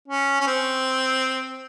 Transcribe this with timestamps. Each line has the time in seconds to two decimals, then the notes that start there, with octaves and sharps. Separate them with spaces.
0.08 C#4
0.41 C#4
0.47 C4